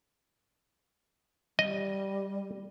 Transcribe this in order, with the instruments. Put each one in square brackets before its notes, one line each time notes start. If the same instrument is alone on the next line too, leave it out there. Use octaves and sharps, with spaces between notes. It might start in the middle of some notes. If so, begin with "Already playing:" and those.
[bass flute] G3 [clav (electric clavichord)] D#5